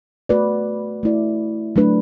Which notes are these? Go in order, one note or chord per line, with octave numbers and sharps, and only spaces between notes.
A3 F#4 B4 D5
A3 E4 D5
F#3 A3 D4 B4